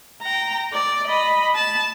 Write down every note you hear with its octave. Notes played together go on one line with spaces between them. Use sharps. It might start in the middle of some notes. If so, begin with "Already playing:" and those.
G5 A#5
D5
D#5 B5
A5